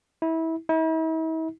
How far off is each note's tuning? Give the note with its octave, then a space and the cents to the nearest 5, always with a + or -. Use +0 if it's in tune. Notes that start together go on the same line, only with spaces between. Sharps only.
E4 -25
E4 -45